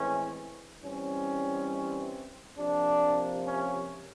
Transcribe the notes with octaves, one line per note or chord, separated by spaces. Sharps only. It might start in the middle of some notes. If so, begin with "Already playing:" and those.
Already playing: A2 E3 G#3 C4 C#4
E3 G3 C4 C#4
C3 F3 A#3 D4
C#4